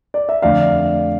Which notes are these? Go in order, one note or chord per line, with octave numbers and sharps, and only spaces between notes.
D5
E5
F2 D3 A3 D5 F5